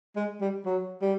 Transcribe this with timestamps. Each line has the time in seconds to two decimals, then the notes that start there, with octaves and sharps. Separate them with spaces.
0.16 G#3
0.41 G3
0.65 F#3
1.02 G3